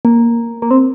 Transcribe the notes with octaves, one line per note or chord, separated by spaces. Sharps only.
A#3
A#3
C4